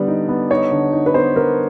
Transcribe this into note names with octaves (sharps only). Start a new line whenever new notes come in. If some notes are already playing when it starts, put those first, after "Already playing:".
Already playing: D3 G3 B3 D5
D#4
B3
D#4 C#5
D3
D#4
B4
B3 C5
B3 A#4